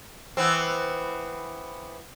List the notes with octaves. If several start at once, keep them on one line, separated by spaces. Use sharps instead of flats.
E3 B3 C4